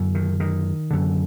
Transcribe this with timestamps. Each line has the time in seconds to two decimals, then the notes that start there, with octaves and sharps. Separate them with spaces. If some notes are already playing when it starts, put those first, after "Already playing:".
Already playing: F#2 D3
0.15 D#3
0.40 D#3
0.91 F#2 D3